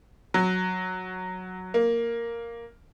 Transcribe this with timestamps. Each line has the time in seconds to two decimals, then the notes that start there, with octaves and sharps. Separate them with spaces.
0.34 F#3
1.74 A#3